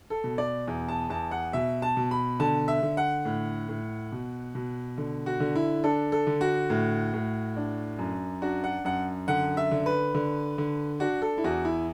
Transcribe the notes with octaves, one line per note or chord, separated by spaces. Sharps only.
A4
B2
D5
E2
A5
E2 A5
F#5
B2 E5
A5
B2
B5
D3 A5
E5
D3
F#5
A2
A2
B2
B2
D3
F#4
D3
E4
D4 A4
A4
D3
F#4
A2
A2
D4
F#2
D4 F#4
F#5
F#2 F#5
D3 F#5
E5
D3
B4
D3
D3
D4 F#4
A4
E4
E2 F#4
E4